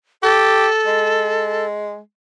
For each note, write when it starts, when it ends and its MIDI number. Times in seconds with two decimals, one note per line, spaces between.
0.23 0.67 67
0.23 1.66 69
0.86 1.99 56